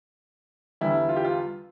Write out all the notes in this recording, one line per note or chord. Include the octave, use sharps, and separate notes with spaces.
E2 D3 G3 E4
F4
G4
F4